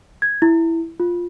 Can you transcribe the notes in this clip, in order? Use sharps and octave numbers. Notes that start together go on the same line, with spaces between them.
G#6
E4
F4